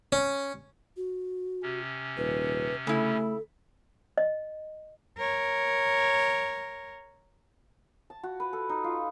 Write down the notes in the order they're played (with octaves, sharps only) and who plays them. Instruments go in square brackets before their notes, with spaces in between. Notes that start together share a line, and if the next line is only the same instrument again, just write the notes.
[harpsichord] C#4
[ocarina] F#4
[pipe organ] C3 C#4
[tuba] D#1 [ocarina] B4
[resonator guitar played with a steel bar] C#3 E4 [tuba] A3 [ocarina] A4
[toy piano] D#5
[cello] A#4 C#5
[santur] A5
F#4
B4
A4
D#4
F4